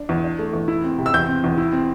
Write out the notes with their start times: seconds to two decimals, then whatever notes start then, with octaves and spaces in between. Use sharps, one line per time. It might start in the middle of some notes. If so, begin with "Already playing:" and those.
Already playing: D4
0.09 E2
0.24 D4
0.39 A3
0.53 E2
0.68 E4
0.84 C4
0.98 C3
1.06 E6
1.14 E2 G6
1.28 C4
1.44 E2
1.58 E4
1.73 C4